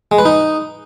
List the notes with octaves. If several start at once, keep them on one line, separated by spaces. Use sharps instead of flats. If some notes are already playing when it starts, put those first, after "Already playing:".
G#3
B4
D#4